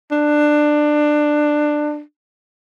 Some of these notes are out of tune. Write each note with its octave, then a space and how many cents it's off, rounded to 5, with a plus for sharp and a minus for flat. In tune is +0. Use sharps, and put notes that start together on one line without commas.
D4 +15